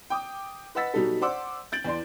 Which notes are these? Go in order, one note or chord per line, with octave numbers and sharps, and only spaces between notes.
G5 D6 D#6
B4 D#5 F#5 E6 A6 B6
B2 F#3 G3 D#4 F#4 A4
C5 D5 F#5 C6 D6 E6
G6 A6 D7 F#7
E2 D5 C6